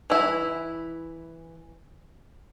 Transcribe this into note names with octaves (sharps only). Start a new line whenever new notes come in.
E3 E4